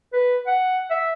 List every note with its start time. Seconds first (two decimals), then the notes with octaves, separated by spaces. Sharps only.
0.13 B4
0.47 F#5
0.90 E5